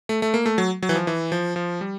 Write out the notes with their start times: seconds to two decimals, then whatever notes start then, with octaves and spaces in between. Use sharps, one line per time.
0.09 A3
0.22 A3
0.34 A#3
0.46 A3
0.58 F#3
0.83 F#3
0.89 E3
0.96 F3
1.07 E3
1.32 F3
1.56 F3
1.81 G3